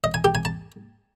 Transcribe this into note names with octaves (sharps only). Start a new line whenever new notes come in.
D#5
G#5
G4
G#5
A5